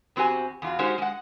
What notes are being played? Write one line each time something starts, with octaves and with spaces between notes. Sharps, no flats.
E2 C4 F#4 G4 G#5
E2 F4 F#4
G#3 C#4 D#4 F#4 G4 C5
G#3 F#5